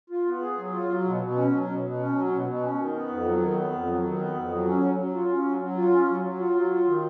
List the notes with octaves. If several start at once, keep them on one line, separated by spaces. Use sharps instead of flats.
F4
B3
G#4
F#3
F4
F#3
B2
B2
C#4
F#3
B2
B2
C#4
F#3
B2
B2
C#4
D#3
B3
F2
F#3
D#3
B3
F2
F#3
D#3
B3
F2
F#3
C#4
F#3
F#3
F4
C#4
F#3
F#3
F4
C#4
F#3
F#3
F4
F#3
F4
D#3